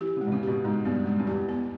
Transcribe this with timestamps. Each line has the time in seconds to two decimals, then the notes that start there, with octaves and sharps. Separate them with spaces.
0.01 E3 G4
0.17 C#3 G#3
0.27 B2
0.32 C#3
0.43 B2 G4
0.64 G#2 G#3
0.85 G2 B3
1.06 G#3
1.19 G2
1.27 E2 G4
1.48 B3